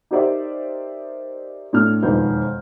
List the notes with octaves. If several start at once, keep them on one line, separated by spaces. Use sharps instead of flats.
D#4 G4 A#4 C5 D5 E5
A2 D4 F6
E1 F2 D#3 B4 C5 G6